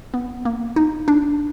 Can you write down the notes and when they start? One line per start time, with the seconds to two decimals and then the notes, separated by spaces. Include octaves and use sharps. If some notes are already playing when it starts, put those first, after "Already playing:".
0.14 B3
0.45 A#3
0.76 D#4
1.08 D4